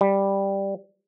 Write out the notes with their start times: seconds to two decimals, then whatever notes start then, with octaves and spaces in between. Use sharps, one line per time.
0.01 G3